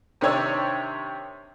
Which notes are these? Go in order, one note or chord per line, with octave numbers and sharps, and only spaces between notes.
C3 D#3 D4 C#5 E6